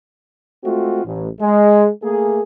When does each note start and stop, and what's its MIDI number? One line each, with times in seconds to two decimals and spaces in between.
0.64 1.03 56
0.64 1.03 57
0.64 1.03 60
0.64 1.03 65
0.64 1.03 66
1.05 1.28 33
1.41 1.89 56
2.03 2.42 57
2.03 2.42 58
2.03 2.42 68